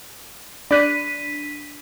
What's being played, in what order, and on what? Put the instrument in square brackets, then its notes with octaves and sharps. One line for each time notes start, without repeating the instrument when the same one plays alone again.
[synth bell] D4 B6 D#7 [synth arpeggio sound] D5 F#6